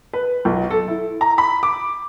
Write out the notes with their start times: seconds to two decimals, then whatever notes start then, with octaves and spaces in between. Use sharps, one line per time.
0.13 B4
0.45 B1
0.71 A4
0.88 E4
1.21 A#5
1.38 B5
1.63 D6